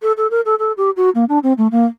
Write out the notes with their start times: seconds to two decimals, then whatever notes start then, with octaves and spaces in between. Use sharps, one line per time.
0.02 A4
0.17 A4
0.31 A#4
0.45 A4
0.59 A4
0.77 G4
0.96 F#4
1.15 A#3
1.29 D4
1.43 C4
1.58 A3
1.71 A#3